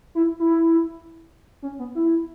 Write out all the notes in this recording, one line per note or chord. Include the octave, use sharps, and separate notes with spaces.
E4
E4
C#4
B3
E4